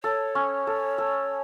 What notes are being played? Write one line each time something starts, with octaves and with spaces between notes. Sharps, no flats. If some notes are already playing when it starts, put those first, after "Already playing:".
A4 C#5
C#4
A4
A4